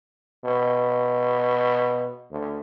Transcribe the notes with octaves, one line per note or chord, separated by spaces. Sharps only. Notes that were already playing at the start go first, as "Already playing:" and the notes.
B2
D2